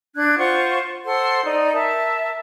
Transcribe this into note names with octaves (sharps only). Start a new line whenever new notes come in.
D4 F#6 G#6
F4 C5 F#5 C#6
A4 C5 F#5 C6
D#4 D5
A#4 E5 A5